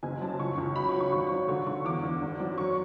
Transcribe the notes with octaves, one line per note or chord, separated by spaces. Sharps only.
F#1 G#5
F#2 A5
C#2 C#6
C#2
F#3 B5
C#6
F#3
C#6
G#1 C#6
F#3
D3 C#6
D3 C#6
E2 D6
E2
G#1
F#2
F#3 C#6